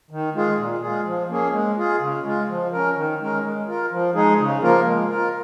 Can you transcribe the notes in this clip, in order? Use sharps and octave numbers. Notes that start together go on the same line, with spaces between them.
D#3
G#3 F4 G#4
A#2
G#3 F4 G#4
F3
A#3 C#4 G#4
G#3
F4 G#4
C#3
G#3 F4
F3
C#4 A#4
D#3
G#3 C#4 A#4
G#3
F4 A#4
F3
G#3 D#4 G#4
C#3
F3 A#3 F4 A#4
G#3
F4 A#4